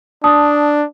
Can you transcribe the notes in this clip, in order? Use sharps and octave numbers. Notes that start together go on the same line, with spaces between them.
D4 A5 D#6